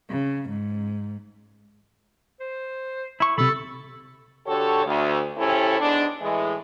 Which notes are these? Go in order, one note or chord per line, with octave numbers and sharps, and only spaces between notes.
C#3
G#2
C5
E4 C#6
B1 C3 A4 B5
D3 F#4 G4 A4 C#5
D2
C#3 C4 C#4 E4 G4 A4
G#2 G#3 B3 D4
A2 E3 G#3